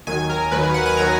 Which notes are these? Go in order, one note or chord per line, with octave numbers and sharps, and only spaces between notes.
D#2 D#3 F#3 G#5
A#4
D#2 D#3 F#3 B4
B4
F#5
G#5
D#3 F#3 A#5